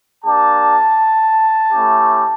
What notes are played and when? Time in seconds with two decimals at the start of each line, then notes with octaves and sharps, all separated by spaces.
0.25 A#3 D4 G4 A5
1.72 A3 C#4 E4 G4